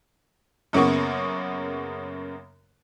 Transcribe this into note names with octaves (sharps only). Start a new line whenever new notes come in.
F#2 C#3 A#3 B3 C#6